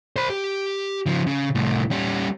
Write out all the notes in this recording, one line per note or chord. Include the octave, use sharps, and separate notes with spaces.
C5 B5
G4
C#3 F3
C#3
C2 A2
G3 C#4